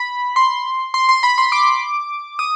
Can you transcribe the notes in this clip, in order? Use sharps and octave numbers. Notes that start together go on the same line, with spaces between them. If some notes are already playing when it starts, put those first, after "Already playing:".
Already playing: B5
C6
C6
C6
B5
C6
D6
D#6